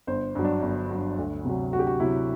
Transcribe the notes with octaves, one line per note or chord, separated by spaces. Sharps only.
G1 C5
G2 F#3
D4
G1
G2 F#3
D2
C3 F#3
D2 F#4
G4
F#4
C3 F#3 E4